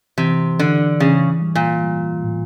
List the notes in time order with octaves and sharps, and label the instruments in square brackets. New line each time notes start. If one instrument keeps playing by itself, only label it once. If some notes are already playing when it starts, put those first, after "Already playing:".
[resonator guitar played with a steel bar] C3 [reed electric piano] E3
[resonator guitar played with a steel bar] D3 [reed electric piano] E3
[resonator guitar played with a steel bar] C#3 [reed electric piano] E3
[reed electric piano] G3
[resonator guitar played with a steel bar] A#2
[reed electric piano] G3
A2